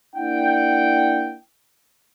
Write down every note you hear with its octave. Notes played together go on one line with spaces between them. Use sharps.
A#3 D4 E4 F#5 G5